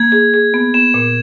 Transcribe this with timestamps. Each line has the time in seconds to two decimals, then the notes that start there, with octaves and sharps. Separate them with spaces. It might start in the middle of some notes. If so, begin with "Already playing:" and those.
Already playing: A#3 G#6
0.12 G#4
0.34 G#4
0.54 B3
0.74 B3 E7
0.94 A#2